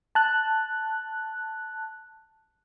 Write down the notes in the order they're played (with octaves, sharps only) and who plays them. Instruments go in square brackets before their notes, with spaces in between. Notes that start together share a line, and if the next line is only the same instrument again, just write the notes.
[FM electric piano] A5 F#6